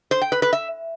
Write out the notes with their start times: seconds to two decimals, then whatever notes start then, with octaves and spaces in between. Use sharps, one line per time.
0.11 C5
0.22 G5
0.32 B4
0.42 B4
0.53 E5